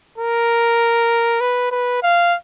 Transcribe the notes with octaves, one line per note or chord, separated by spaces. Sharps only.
A#4
B4
B4
F5